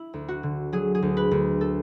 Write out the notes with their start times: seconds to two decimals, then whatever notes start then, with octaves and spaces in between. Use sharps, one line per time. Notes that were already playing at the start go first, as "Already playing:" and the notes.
Already playing: E4
0.14 D2
0.28 F#4
0.43 D3
0.73 F#3 G#4
0.95 G#4
1.02 D2
1.17 B4
1.31 D2
1.61 A4